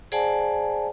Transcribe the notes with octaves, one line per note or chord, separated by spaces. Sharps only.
G#4 C5 D5 F#5 G#5 A5